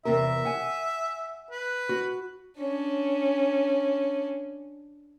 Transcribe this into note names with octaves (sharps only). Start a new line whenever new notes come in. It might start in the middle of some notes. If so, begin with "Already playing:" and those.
E2 C3 A#4 E5
F#5 G#5
B4
F#4
C#4 D4